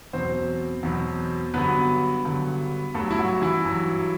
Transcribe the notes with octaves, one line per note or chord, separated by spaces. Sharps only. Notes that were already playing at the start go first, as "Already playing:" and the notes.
E2 B2 F#3 C4 C5
E2 B2 F#3
G2 D3 F#3 B3 B4
G2 D3 F#3
G2 F#3 A3 A4
E4
F#3 F#4
E3 E4
G2 F#3